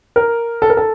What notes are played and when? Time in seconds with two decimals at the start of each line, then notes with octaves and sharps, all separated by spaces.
0.16 A#4
0.62 A4
0.70 A#4
0.77 A4